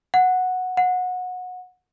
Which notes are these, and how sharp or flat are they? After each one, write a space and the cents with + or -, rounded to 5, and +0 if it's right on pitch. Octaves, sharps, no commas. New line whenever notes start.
F#5 -10
F#5 -20